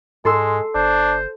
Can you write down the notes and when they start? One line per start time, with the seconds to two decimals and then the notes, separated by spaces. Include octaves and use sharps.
0.25 G#2 G#3 A4 C6 E6
0.75 G1 D4 C5